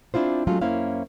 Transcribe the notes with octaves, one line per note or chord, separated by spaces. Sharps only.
C4 D4 E4 F4 C5
F#3 G#3 A3 C#4 F4
F#2 A#3 C#4 E4 C5 F5